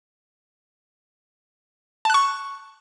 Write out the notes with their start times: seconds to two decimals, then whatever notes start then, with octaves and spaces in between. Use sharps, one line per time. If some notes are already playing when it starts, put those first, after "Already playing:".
2.05 A5
2.10 F#6
2.14 C#6